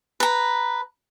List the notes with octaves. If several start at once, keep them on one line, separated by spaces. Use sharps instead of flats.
B4 A#5